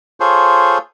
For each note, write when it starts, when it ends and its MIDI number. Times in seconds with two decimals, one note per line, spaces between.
0.20 0.78 65
0.20 0.78 68
0.20 0.78 69
0.20 0.78 72
0.20 0.78 73